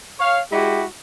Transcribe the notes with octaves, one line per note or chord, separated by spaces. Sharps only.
C#5 F5
G#3 E4 F#4 G4